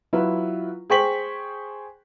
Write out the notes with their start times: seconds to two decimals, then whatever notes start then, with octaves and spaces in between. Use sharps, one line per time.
0.13 F#3 E4 F4 B4
0.90 G#4 C5 G5 C#6 B6 F#7